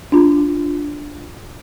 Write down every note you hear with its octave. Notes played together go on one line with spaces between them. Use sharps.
D4 F4